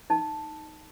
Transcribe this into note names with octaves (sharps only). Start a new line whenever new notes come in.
D#4 A5